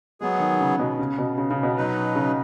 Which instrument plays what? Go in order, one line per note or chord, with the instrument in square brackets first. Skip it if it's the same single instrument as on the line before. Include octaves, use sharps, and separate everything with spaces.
[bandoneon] F#3 B3 G#4 [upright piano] G#3
[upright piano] D#3
C#3
B2
C#3
B2
C#3
C#3
B2
[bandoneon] F#3 D#4 B4
[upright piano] C#3